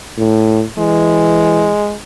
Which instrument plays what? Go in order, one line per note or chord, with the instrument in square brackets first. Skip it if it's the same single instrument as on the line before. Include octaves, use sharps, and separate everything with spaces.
[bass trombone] A2
[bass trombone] E3 [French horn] G#3